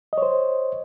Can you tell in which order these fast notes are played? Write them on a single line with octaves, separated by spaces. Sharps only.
D#5 C#5 C5